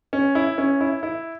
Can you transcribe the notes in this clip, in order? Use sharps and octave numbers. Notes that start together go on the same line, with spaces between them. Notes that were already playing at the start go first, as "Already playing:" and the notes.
C#4
E4
C#4
E4
E4